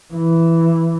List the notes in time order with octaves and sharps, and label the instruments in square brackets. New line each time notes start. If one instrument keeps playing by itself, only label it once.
[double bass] E3